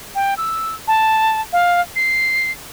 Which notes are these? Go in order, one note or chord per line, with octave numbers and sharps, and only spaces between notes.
G5
E6
A5
F5
C7